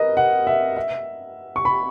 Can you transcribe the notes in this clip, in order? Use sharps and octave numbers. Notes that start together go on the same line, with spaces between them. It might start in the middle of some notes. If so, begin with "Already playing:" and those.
Already playing: A#4 B4 D#5
F#5
E5
E5
C#6
B5